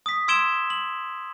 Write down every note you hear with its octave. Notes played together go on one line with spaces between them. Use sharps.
D#6 B6
C6 E6 G#6 D7 E7 G7
F#7